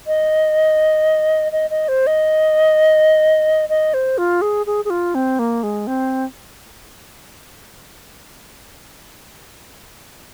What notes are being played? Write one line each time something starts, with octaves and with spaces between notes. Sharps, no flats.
D#5
D#5
D#5
C5
D#5
D#5
C5
F4
G#4
G#4
G#4
F4
C4
A#3
G#3
C4